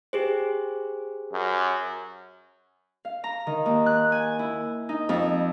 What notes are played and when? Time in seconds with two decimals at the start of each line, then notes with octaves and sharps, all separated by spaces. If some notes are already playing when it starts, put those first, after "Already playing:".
0.13 G4 G#4 C5
1.33 F#2
3.05 F5
3.24 A#5
3.47 D#3
3.66 D#2
3.86 F#6
4.12 G#5
4.39 E4
4.89 D#4
5.09 F2